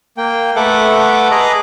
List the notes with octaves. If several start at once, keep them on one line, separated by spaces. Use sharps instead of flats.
A#3 G5
A3 A4 B4 E5 F#5 D6
G#4 B4 D#5 A#5 D6 F#6